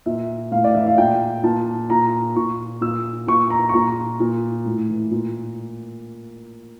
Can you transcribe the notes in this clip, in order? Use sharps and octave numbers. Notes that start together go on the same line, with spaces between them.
A#2 E5
A2 F5
D5
E3 E5
F5
A#2 G5
A#2 A5
A#2 A#5
A#2 C#6
A#2 E6
A#2 C#6
A#5
C#6
A#2 A#5
A#2
A2
E3
A#2